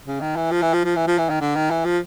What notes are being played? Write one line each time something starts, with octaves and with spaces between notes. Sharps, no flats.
C#3
D#3
E3
F3
E3
F3
F3
E3
F3
E3
D#3
D3
D#3
E3
F3